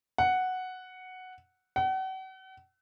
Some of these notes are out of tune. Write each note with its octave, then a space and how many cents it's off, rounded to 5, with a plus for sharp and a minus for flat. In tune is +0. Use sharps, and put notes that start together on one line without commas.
F#5 +0
F#5 +40